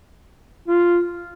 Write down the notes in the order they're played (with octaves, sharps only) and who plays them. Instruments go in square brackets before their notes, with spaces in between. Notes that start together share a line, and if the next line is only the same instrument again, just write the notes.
[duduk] F4